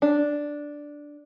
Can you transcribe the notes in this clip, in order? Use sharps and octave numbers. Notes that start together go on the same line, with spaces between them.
D4